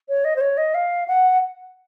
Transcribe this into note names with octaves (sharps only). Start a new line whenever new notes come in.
C#5
D#5
C5
C#5
D#5
F5
F#5